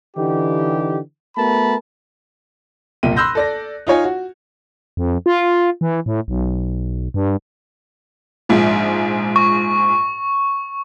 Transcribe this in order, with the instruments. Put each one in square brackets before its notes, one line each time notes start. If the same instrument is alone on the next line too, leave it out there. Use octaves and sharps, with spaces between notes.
[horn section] D3 E3 D#4 G4
A3 B3 F#4 A#4 A5 B5
[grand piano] F#1 C2 A#2 E5 G5 D#7
B5 C6 E6 F#6 G6 A#6
A4 D5 A#6
D#4 F4 C#5 G#5
F#4
[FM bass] F2
F4
E3
A2
B1
G2
[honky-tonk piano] A#1 G#2 F3
[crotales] C#6